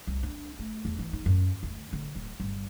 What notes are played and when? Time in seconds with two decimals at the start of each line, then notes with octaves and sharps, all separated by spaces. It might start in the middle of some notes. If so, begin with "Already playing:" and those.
0.07 C2
0.23 D4
0.59 A3
0.85 E2
0.99 E3
1.13 D#4
1.26 F#2
1.63 D2
1.93 D3
2.15 D1
2.40 G1